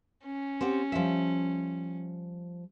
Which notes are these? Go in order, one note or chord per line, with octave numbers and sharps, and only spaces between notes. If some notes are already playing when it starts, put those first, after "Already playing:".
C#4
C4 G4 F#5
F3 G3 E5